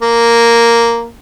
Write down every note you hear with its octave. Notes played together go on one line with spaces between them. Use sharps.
A#3